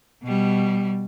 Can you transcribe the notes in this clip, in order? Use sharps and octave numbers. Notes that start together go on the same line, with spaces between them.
B2 G3